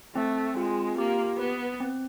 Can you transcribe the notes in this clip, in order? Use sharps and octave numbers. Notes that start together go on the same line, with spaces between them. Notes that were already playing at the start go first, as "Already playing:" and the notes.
A3 C4
G#3 F4
A#3 G4
B3 B4
C4